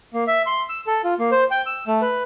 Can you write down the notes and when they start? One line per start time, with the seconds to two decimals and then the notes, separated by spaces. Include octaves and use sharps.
0.14 A#3
0.27 E5
0.46 C6
0.69 E6
0.87 A4
1.04 F4
1.19 A#3
1.32 C5
1.51 G5
1.66 E6
1.87 A3
2.02 B4